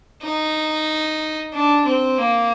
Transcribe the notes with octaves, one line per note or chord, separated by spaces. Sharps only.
D#4
D4
C4
A#3